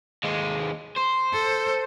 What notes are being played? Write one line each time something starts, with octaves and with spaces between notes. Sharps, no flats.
D#2 G#3
C5
A4